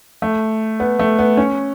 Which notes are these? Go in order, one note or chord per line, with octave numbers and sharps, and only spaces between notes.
A3
B3
A3
B3
C#4